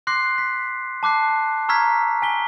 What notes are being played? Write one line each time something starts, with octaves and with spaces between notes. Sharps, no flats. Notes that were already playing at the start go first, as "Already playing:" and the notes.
C6 D6 F#6 A#6 C7
B6
A5 D6 F#6 C7
F#6
A#5 C#6 E6 F6 G#6 B6
G#5 B6 G7